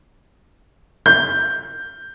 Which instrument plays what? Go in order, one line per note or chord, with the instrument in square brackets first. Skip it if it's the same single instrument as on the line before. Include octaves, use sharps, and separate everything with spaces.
[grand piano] G6